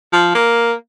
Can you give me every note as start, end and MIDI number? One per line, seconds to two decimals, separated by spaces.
0.13 0.30 53
0.34 0.72 58